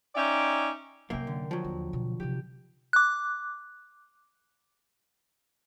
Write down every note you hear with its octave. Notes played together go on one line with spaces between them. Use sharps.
C#4 D#4 D5 E5 G5
F#2 C3 F#3 A#3 A#4 G5
D3
F3 F#3
D#2
B2
C3 D#4 G4
D6 F#6